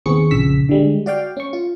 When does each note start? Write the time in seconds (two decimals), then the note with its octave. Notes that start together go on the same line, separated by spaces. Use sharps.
0.06 D#2 B3 C4 G#4 C#6 C#7
0.31 A#1 F2 C#3 E6 B6
0.69 D3 G3 G#3
1.06 F#4 D5 F5 G5
1.37 C#4 C#6
1.53 F4